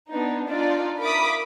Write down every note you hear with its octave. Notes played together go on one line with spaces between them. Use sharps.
B3 D4 D#4
D4 D#4 F4 D5
A#4 E5 B5 D6 D#6 B6